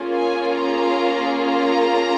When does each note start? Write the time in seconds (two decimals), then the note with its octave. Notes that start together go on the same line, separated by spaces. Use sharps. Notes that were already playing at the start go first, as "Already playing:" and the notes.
Already playing: A#3 C#4 F4 G#4
0.14 G#5
0.56 A#5
1.38 A#5